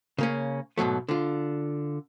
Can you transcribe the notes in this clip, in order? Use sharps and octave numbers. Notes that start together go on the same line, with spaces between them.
C#3 A#3 C#4
G#2 B2 F#3 A3
D3 F4